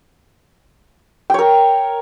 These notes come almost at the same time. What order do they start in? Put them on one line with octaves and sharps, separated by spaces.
G5 C#5 A#4